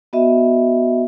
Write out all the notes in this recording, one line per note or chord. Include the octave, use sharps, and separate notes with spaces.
B3 F#4 D#5 E5